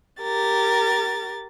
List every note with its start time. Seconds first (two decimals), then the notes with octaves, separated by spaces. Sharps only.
0.21 G4 A#4 A6